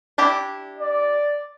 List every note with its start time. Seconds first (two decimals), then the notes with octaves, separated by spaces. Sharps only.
0.18 D4 E4 G4
0.79 D5